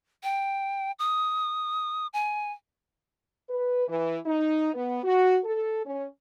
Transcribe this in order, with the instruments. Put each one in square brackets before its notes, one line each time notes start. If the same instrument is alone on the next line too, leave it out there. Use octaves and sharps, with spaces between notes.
[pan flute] G5
D#6
G#5
[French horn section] B4
E3
D#4
B3
F#4
A4
C#4